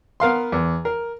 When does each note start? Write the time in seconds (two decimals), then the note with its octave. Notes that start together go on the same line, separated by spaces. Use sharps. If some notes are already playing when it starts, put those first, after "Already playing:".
0.20 B3 A#4 F5 C6
0.52 E2
0.85 A#4